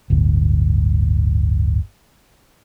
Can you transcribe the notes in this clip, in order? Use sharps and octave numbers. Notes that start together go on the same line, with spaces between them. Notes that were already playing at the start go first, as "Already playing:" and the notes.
D1 G1 D2